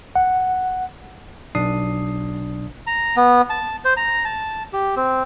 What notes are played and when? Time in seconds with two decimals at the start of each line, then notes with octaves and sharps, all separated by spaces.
0.16 F#5
1.55 B1 D4 D#6 C7
2.87 A#5
3.17 B3
3.50 A5
3.85 C5
3.97 A#5
4.25 A5
4.73 G4
4.96 C4